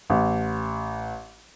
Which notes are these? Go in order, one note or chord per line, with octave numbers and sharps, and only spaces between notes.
A1